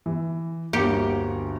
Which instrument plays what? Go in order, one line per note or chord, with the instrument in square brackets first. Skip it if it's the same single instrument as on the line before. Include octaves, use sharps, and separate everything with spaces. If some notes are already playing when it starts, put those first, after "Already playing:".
[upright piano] E3
[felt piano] G1 D2 A#5 [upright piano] A#3 C#7 [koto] G4